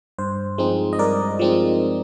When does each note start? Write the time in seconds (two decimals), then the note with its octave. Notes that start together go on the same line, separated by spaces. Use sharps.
0.18 G2 C5
0.58 F3 G#3 C4 D#4
0.93 D#5
0.99 G2 A#4 D5
1.39 F3 G#3 C4 D#4